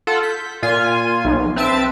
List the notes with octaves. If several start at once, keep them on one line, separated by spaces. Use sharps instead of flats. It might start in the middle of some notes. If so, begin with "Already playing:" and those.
F4 A4 F#5
G6 B6
A#2 F4 G#5
B1
C4 B4 E5 A5 E6 D7